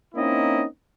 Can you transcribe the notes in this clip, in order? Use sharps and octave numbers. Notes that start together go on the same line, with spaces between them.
A#3 C4 C#4 D#4 E4 D#5